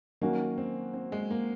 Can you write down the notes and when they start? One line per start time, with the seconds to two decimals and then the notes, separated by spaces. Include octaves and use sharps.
0.21 D#3 F#3 A#3 C#4 F#4
0.58 C4
0.94 C4
1.12 G#3
1.31 A#3